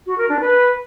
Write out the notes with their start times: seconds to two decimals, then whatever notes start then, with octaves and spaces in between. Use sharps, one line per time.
0.06 F#4
0.18 A#4
0.29 D4
0.40 B4